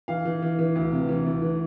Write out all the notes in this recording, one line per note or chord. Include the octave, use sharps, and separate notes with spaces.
E3 F5
E3
E3
E3
D2
C3
E3
D2
E3